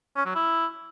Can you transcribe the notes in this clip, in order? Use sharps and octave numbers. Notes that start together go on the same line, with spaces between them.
C#4
F#3
E4